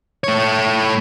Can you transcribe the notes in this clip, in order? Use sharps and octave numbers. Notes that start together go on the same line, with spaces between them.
A3 C#5